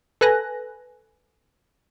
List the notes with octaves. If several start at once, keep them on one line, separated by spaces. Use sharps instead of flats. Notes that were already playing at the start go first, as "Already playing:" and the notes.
A4 B4 G#5 F#6 A#6